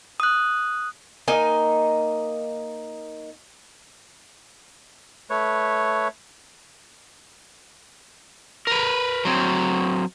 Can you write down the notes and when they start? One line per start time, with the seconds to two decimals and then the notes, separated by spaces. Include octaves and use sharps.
0.20 D#6 F#6
1.28 A#3 D#4 G#5
5.30 A3 B4 C#5
8.67 A#4 B4
9.25 F#3 C4